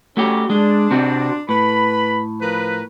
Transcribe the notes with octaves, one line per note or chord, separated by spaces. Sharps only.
A3 C#4 F#4 G4
G#3 D4
C3 C4 F#4
A2 B4 B5
F3 A#4 B4